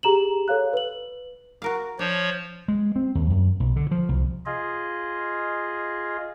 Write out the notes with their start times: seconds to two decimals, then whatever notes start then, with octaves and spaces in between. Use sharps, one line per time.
0.03 G4 G#4 A#5 E7 F#7
0.48 A4 C#5 F5 F#6
0.73 B4 F#7
1.62 F#4 A#4 F5
1.99 F3 D4 C#5
2.68 G#3
2.96 C4
3.15 D#2
3.30 F#2
3.60 B1
3.76 D3
3.91 F3
4.09 C2
4.46 F4 G#4 D#5